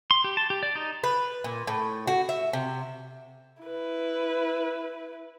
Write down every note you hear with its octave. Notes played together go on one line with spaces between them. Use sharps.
C6
G4
A5
G4
D5
D#4
B4
A#2
A2
F#4
E5
C3
E4 B4